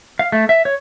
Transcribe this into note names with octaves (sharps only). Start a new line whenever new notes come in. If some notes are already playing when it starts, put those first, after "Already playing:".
F5
A3
E5
C#5